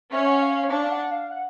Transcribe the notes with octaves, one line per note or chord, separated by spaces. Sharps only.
C#4 E5
F#5
F5
F5
D4 F5
F5
F#5
F5
F#5